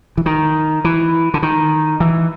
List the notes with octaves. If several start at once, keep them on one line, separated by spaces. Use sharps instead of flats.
E3
D#3
E3
D3
D#3
E3